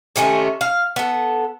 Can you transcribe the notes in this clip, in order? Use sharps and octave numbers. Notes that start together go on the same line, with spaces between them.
C3 D#3 A3 C#4
F5
B3 A4